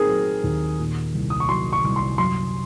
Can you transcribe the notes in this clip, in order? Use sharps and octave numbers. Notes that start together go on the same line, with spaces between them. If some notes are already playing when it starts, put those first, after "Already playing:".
Already playing: D#3 C4 G#4 A#4
F#3
D#2
A#2
C2
D#6
C#6
F#3 C6
C#6
C2
C6
F#2 C6